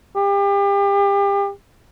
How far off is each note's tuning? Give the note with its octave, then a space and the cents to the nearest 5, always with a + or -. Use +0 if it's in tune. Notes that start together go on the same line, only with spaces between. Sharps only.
G4 +35